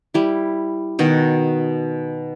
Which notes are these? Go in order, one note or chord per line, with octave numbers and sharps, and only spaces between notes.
G3 E4
B2 D#3 F#4